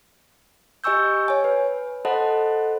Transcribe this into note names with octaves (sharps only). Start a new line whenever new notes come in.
G4 D#5 G#5 C#6 E6 G6
C#5 G#5
B4
A4 C5 D#5 F#5 A5 B5